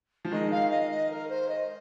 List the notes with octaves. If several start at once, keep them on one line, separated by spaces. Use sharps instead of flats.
F3
D#3 G#3 D#5
F5
D#5
D#5
A#4
C5
D#5